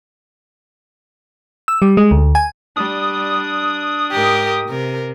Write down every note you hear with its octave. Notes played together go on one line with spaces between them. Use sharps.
E6
G3
G#3
D2
G#5
G3 D4 D#6
G#2 G4 A#4
C3 A#4